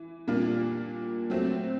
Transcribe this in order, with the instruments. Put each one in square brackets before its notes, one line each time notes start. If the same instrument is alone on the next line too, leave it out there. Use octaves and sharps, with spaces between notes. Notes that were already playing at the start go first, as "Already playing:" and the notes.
Already playing: [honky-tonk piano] E3
A#2 G3 A#3 D4 F4
F#3 A3 C4